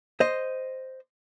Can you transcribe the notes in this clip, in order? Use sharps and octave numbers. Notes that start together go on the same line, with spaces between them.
C5 D#5